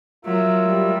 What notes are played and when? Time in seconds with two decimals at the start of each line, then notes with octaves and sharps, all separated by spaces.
0.25 F#3 F4 A#4 E5
0.66 G3